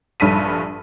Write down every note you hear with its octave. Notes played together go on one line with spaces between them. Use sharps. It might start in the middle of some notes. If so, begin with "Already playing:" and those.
A#1 G2 A4 B6 D#7